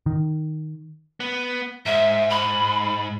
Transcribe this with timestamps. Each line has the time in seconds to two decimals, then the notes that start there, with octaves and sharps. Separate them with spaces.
0.06 D#3
1.20 B3
1.86 G#2 E5
2.30 B5